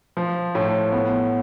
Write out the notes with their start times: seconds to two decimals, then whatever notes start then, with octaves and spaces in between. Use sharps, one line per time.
0.17 F3
0.55 A2
0.92 B3